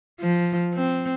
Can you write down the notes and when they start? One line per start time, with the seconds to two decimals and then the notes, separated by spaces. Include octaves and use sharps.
0.21 F3
0.74 C4